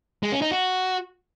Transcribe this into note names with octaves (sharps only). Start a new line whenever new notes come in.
G#3
C#4
D#4
F#4